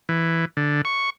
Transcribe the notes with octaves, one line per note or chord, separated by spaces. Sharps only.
E3
D3
C#6